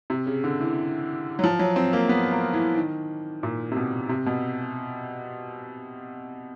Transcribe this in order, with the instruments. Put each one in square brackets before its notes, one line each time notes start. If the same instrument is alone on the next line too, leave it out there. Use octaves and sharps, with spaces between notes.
[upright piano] C3
C#3
D3
E3
F#3
F3
F#3
C4
A#3
B3
A#3
E3
D#3
A#2
C3
B2
C3
B2